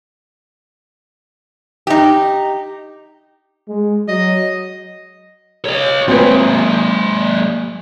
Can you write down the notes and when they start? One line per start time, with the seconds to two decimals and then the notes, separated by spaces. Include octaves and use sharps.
1.87 D#4 G4
3.69 G#3
4.08 F#3 D#5
5.65 C#5 D#5
6.08 G#3 A#3 C4 B4